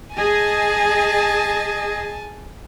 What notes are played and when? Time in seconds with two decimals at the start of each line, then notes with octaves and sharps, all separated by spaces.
0.16 G#4 D#5 G#5 A5